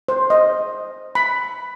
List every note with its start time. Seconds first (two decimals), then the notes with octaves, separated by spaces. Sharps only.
0.08 C5
0.30 D#5
1.15 B5